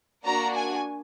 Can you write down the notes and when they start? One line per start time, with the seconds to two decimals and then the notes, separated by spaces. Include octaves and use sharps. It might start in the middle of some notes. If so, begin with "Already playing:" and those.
0.25 A#3 D4 F#4 A#5
0.55 G#5